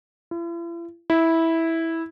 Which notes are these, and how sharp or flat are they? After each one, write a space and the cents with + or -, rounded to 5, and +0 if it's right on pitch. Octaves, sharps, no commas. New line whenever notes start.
E4 +45
E4 -10